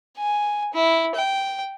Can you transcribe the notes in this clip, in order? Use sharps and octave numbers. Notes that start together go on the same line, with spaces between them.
G#5
E4
G5